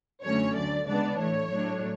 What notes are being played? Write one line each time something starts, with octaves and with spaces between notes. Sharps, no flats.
F#2 D3 F#3 A3 C#4 C#5
D2 D3 F#3 D5
C#3 G#3 B3 D4 D5
A2 E3 A3 C#5
A2 F#3 A3 D4